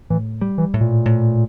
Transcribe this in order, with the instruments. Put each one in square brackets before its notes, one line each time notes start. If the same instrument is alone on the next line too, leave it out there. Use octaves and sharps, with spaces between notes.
[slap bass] A2 [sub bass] E3
[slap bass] G3
[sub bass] E3
[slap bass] A2
[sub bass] A#2
[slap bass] A2